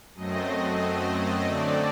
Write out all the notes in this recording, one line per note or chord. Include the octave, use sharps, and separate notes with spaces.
F#2 F#3 A3 C4 D#5
D3 F#3 A3 C4 D5